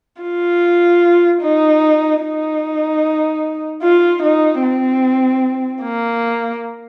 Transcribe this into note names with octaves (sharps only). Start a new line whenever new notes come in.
F4
D#4
D#4
F4
D#4
C4
A#3